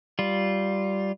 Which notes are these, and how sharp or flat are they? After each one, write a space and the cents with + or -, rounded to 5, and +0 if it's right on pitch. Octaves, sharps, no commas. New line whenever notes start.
G3 -10 F4 +0